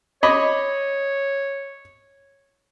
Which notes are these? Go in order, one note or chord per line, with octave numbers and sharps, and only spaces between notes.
C#5 D#5 B5 D6